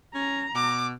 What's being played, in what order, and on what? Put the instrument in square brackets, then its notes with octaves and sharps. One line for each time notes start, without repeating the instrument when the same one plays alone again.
[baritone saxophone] C#4 [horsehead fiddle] A#5
[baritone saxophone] B2 [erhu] D6